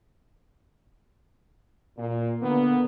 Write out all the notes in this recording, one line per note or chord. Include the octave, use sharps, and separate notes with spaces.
A#2
D3 A#3 B3